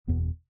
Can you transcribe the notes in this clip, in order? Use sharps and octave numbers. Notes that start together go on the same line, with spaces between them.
F#1 E2 B2 B3